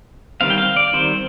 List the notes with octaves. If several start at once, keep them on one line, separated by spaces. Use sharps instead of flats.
D#3 G3 C4 F5
G5
F5
D5
D#3 G3 C4 C5